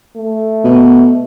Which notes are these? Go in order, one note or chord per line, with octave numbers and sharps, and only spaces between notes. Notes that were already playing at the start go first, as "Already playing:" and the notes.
A3
B2